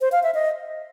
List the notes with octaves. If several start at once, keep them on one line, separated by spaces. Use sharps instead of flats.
C5
F5
E5
D#5